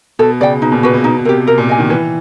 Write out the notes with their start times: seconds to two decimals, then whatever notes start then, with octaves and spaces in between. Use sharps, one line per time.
0.19 B2 A4
0.40 C#3 D5 G5
0.62 B2 D#4
0.72 A#2
0.83 A#2 F#4 B4
0.94 B2
1.04 B2 D#4
1.18 B2
1.25 C3 G4 A#4
1.47 C3 A#4
1.58 A#2
1.69 D#5 G#5
1.79 D#3
1.90 E3 B4